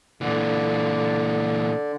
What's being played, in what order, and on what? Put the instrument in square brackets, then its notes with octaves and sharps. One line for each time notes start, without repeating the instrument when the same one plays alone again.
[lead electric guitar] A#2 E3 [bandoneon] D3